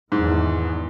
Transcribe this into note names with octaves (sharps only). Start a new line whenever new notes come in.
E2 G#2 D#3